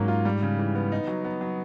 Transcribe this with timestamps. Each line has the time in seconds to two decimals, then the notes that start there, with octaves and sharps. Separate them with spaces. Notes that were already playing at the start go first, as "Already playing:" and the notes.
Already playing: G#2 F#3 A#3 C#4
0.08 F4
0.25 G3
0.42 C#3
0.59 E3
0.75 B3
0.92 D#4
1.07 F#3
1.25 B3
1.41 F#3